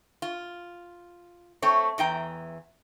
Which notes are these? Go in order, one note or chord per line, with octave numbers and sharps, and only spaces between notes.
F4
A3 C4 C#5
E2 E3 G5 A#5